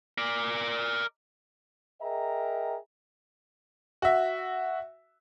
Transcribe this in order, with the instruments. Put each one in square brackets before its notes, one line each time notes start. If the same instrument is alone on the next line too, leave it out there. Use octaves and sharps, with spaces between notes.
[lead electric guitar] A#4 D5
[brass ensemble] G#4 A#4 D#5 E5 G5 A#5
[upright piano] F#4 E5